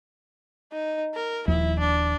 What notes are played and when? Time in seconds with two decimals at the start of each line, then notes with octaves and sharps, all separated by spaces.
0.72 D#4
1.14 A#4
1.48 D#1 D#2 F3 E4
1.79 D4